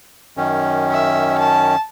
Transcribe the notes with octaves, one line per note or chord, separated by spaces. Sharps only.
F#2 D#3 C#4
E5
A5